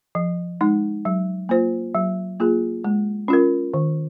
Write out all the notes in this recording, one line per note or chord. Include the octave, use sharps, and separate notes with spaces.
F3
G#3 D#4
F#3
A#3 F4 C5
F#3
A#3 F4 G#4
G#3
C#4 F4 A#4
D#3